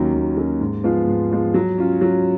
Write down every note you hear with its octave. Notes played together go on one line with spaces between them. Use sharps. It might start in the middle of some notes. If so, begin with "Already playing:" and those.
Already playing: D#2 D#3 F#3 C#4
D#2
D#3 F#3 C#4
G#2
F3 G#3 B3 F4
G#2
F3 G#3 B3 F4
F#3
C#4 F4
F#3